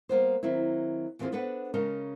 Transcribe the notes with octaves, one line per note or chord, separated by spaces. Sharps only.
G3 A#3 B3 C5
D#3 F#3 C4 E4
D#2 E3 B3 C4 F4 G#4
B3 D4 A4 B4 C5 F#5
C#3 G#3 C#4 D#4 A#4 A5